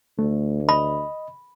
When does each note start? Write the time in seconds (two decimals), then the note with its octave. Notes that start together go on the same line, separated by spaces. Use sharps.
0.19 D2 A3
0.69 D#5 B5